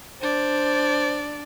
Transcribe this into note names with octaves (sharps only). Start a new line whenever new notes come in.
D4 C5 D5